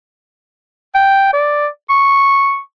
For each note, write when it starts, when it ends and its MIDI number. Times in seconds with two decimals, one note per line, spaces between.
0.95 1.30 79
1.33 1.67 74
1.90 2.59 85